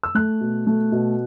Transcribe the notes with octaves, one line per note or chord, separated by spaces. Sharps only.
E6
A3 F#6
B2
A3
B2